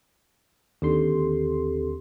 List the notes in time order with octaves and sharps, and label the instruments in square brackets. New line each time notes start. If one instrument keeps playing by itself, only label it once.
[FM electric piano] D#2 D3 C6 [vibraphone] C4 G4 A4